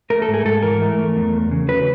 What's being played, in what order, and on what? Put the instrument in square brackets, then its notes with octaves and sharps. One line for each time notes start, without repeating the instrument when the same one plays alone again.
[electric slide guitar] A3 A#4
A4
G#2
G#4
G#2 A4
E3 A#4
A3
A3
E2
E2
C#3
F#3 B4